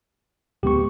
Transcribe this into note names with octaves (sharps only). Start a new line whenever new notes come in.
D1 G#3 B3 G4 C#6